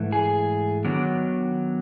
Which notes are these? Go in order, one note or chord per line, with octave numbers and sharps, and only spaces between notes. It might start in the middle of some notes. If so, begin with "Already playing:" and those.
Already playing: G#2 E3 A3
G#4
D#3 F#3 B3 D4